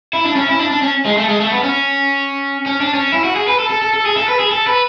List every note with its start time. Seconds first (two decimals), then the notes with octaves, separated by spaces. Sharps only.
0.13 E4
0.25 D4
0.36 C#4
0.48 E4
0.59 D4
0.71 D4
0.82 C#4
1.05 G#3
1.17 A3
1.28 G#3
1.40 A3
1.52 B3
1.63 C#4
2.66 C#4
2.80 D4
2.94 C#4
3.12 E4
3.24 F#4
3.36 G#4
3.48 B4
3.59 A4
3.70 A4
3.82 A4
3.93 A4
4.05 G#4
4.17 A4
4.28 B4
4.40 G#4
4.51 A4
4.67 B4